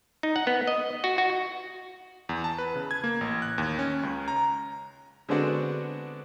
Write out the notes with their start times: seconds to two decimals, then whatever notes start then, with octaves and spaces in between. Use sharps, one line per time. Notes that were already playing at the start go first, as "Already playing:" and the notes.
0.23 D#4
0.36 F#5
0.47 B3
0.67 D#5
1.04 F#4
1.18 F#4
2.29 E2
2.44 A5
2.58 B4
2.75 C#3
2.91 G#6
3.04 A#3
3.21 A1
3.42 F#6
3.58 D#2
3.79 C#4
4.03 C#2
4.28 A#5
5.29 D3 G#3 B3 C4 D4 F#4